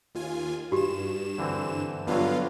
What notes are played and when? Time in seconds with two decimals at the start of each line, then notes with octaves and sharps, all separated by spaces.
0.15 D#2 F4 G#5
0.72 G2 F#4 G4 E7
1.38 D3 E3 C4
2.07 G2 D3 F#3 B3 F4 F5